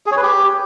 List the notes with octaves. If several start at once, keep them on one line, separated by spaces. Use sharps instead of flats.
G#4
C#5
B4
G4